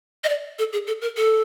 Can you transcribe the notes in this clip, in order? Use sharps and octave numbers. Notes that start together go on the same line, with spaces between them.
D#5
D5
A4
G#4
A4
A#4
A4